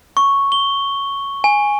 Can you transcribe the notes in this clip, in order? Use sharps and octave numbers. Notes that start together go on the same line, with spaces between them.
C#6
G7
G#5